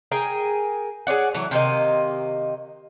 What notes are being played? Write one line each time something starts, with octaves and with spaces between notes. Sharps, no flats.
G#4 A#4 G5 G#5
G#4 C#5 D5 F#5
E3 F#3 A3
C3 D#3 A#3 D#5